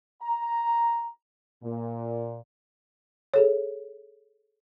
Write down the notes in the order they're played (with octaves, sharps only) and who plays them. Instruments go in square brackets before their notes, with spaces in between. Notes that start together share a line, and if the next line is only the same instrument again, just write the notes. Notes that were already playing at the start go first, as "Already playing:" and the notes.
[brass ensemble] A#5
A#2
[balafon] G#4 A4 C#5